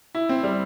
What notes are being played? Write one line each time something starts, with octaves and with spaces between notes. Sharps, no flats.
E4
C4
G3